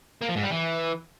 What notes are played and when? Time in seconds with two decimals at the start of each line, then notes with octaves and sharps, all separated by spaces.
0.22 A#3
0.29 F3
0.36 G#2
0.43 G3
0.51 E3